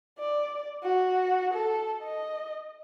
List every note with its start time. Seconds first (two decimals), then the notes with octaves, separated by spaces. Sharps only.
0.19 D5
0.84 F#4
1.53 A4
2.03 D#5